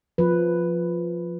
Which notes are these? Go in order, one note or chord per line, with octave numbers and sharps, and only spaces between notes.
F3 B4